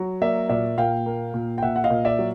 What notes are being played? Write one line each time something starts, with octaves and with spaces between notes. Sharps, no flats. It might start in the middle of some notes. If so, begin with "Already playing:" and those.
Already playing: F#3
A#3 D5 E5
A#2 D5 E5
A#2 F5 G5
A#3
A#2
G5
A#2 E5 F#5
F#5
D#5 F5
A#2
D5 E5
F#3